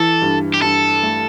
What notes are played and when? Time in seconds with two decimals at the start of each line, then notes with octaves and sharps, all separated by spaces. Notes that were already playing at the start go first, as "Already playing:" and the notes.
Already playing: E3 A4
0.22 G2
0.54 G4
0.62 G2 A4
1.03 A3